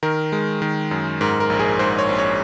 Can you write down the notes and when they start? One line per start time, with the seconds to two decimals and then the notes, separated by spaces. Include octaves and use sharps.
0.03 D#3 A#4
0.32 G#3
0.62 D#3
0.91 F#2
1.21 G#2 A#4
1.40 A#4
1.50 A#1
1.59 G#4
1.79 G#2 C5
1.98 C#5
2.09 A#1
2.18 C#5